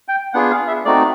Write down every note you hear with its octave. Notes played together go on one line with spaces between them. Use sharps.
G5
B3 D4 F4 G#4 F#5
F5
E5
A3 C4 D#4 F#4 D5